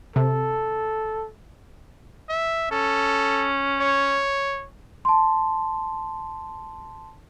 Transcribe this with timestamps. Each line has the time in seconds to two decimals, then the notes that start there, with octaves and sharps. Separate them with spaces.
0.16 C3 A4
2.29 E5
2.71 C#4 A4
3.80 C#5
5.05 A5 C6